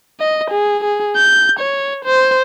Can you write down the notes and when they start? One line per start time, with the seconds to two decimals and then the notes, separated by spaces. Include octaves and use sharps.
0.20 D#5
0.51 G#4
0.84 G#4
1.16 G6
1.59 C#5
2.05 C5